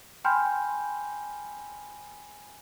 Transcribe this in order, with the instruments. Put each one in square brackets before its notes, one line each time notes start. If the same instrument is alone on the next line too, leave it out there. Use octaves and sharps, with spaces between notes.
[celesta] G5 G#5 B5 C6 F6 G6